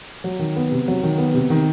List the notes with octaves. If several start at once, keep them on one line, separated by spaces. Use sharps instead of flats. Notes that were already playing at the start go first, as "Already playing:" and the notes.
F#3
D#3
B3
C3
F#3
D#3
B3
C3
D#3